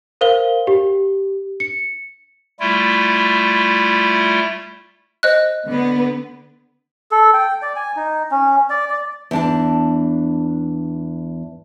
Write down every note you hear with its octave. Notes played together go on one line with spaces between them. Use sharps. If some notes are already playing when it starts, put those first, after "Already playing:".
A#4 C5 F5 G7
G4
C#7
G3 A3 E4 F4
C5 D#5 F#6
D3 B3
A4
G5
D5
G#5
D#4
C#4
D5
D5
E2 D4 A5